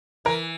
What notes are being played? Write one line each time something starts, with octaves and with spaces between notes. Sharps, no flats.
E3 A#4